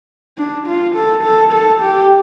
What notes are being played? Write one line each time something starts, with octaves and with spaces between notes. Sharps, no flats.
D4
F4
A4
A4
A4
G4